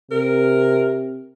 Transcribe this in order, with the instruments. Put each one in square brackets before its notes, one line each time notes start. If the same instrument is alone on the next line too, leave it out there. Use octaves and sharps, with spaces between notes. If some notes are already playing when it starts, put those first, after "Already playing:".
[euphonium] C3 [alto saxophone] A#4